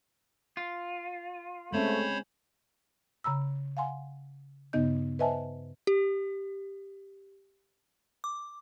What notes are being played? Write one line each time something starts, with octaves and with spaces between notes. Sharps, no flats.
F4
G#3 A3 C4 C#4 C5 C#5 B5
C#3 A#5 B5 E6
F5 F#5 G#5 C6
G2 C#3 B3 D#4 D#5 G6
B4 C5 D#5 E5 G#5 A5
G4
D6